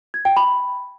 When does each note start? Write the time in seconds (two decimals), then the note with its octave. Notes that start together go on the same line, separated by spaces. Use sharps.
0.14 G#6
0.25 G5
0.36 B5